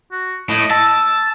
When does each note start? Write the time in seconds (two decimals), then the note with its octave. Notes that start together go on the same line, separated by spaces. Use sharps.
0.11 F#4
0.50 A2 D#5
0.71 A5 E6